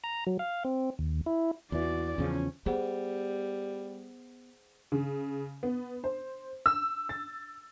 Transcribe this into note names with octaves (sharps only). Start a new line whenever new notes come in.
A#5
F#3
F5
C4
D#2
E4
E2 E3 F#4 D5
E2 C#3 F3 C#4
G3 B3 G#4 C5 F#5
C#3
B3
C5
E6
A6